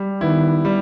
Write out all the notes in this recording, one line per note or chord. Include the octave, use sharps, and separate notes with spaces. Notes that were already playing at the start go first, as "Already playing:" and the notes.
Already playing: G3
D#3 B3 E4
G3